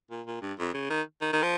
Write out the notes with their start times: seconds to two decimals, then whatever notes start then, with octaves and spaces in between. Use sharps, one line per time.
0.10 A#2
0.26 A#2
0.41 G2
0.58 F2
0.74 C#3
0.90 D#3
1.21 D#3
1.33 D#3
1.42 F3